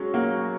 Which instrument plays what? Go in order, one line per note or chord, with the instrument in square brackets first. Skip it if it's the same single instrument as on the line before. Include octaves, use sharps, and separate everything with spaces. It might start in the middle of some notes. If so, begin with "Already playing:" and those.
Already playing: [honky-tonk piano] F#3 C#4 [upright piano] G#3
[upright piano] A#3 [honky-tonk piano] F#4